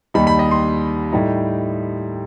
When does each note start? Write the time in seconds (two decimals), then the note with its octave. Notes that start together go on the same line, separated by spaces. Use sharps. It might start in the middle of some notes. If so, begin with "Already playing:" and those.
0.14 D#2 D#3 G3 D#4 B5
0.27 B5
0.39 D#5
0.51 C6
1.12 A2 G3 D#4